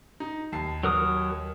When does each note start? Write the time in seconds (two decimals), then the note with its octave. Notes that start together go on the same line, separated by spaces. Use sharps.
0.20 D#4
0.52 D#2 A5 C7
0.83 F#3 A#4 D#6